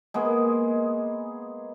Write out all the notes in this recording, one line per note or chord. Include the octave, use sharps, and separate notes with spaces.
G#3 A#3 B3 G#4